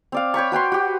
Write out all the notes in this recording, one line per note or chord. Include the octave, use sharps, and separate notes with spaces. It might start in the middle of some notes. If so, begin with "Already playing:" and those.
C4 D5 F5
C#5 G5 B5 C#6
F#4 B4 G5 C6
F#4 G4